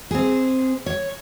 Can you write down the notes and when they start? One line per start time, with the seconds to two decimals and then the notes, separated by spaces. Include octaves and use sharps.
0.11 C4 G#4
0.86 C#5